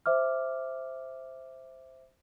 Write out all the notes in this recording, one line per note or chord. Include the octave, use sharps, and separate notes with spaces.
C5 E5 D6 F6